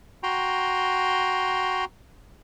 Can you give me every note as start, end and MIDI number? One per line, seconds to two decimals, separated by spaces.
0.23 1.85 66
0.23 1.85 79
0.23 1.85 82
0.23 1.85 84